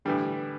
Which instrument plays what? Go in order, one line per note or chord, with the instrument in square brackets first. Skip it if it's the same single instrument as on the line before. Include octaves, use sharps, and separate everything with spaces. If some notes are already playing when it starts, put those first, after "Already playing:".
[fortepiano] A2 E3 G3 [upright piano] D3